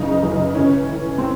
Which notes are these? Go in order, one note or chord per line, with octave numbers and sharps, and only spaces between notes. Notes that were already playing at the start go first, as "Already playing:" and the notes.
Already playing: F#2 C#3 E3 D#4
F#2 C#3 E3
A2 E3 C#4
A2 E3
A2 C4